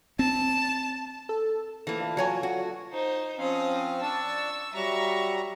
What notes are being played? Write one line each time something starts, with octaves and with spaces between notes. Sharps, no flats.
C4 A5
A4
E3 F3 A3 A#3 G5
D4 F4 A4
F#3 C#5 G#5
F#4
D#4 C5
F3 C4 C#4 F5 D#6
D4 A5 C#6 E6
F#3 G3 E5 A#5 C#6